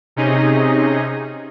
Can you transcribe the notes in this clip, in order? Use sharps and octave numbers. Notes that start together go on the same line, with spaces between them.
C3 C#4 D#4 G#4 D#5